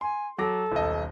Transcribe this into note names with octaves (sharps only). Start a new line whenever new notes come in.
G#5 C6
F#3 A4 D6 A#6
D#1 B1 D#5